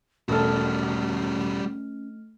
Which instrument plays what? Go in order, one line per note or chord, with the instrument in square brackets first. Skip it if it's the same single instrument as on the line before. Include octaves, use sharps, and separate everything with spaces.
[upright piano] E1 A4 [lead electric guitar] G3 F#4 [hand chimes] A3 F6 [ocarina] C#4